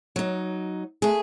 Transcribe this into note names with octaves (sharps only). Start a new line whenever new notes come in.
F#3 D#4
A3 G#4